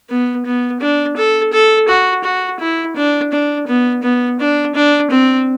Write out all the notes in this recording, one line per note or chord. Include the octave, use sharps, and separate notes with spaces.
B3
B3
D4
A4
A4
F#4
F#4
E4
D4
D4
B3
B3
D4
D4
C4